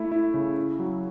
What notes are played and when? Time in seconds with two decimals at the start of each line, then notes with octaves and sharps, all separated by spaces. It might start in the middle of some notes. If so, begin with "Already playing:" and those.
Already playing: A3 E4
0.12 E4
0.34 C#3
0.57 E4
0.79 F#3